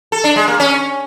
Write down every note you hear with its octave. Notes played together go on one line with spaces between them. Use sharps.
A4
D4
G#3
A#3
C#4